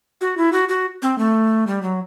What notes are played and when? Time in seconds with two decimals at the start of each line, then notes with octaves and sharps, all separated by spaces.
0.21 F#4
0.37 E4
0.53 F#4
0.69 F#4
1.02 C4
1.18 A3
1.67 G3
1.83 F#3